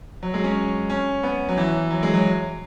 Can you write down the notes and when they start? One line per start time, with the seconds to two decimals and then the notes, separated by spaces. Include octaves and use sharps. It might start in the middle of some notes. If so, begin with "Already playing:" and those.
0.23 F#3
0.34 G#3
0.44 C#4
0.90 C#4
1.23 B3
1.49 F#3
1.58 E3
1.91 F#3
2.03 G#3
2.14 F#3